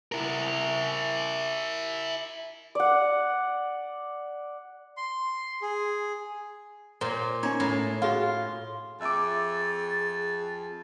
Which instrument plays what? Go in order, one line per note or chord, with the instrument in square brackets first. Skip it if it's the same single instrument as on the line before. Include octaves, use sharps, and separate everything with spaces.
[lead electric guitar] E4 A#4
[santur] D5 F#5
[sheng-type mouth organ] C6
G#4
[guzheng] A#2 [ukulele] C5 C#5
[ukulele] C#4 D#4 [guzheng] C#5
[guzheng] A2
[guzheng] F4 [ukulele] F#4 G#4 F5
[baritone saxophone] F2 [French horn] G#4 [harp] E5 D6 [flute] A6